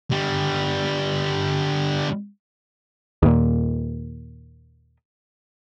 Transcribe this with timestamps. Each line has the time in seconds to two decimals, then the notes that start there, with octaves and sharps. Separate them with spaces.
0.11 D3 G3
3.23 D#2 A#2